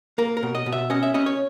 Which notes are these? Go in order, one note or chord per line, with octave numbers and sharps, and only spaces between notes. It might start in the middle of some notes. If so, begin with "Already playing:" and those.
A#3 A#4
A#4
B2
D#5
B2
E5
C#4 D#5
E5
C#4 D#5
C#5